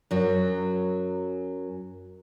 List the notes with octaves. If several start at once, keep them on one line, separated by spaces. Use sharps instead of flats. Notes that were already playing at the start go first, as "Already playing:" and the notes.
F#2 F#3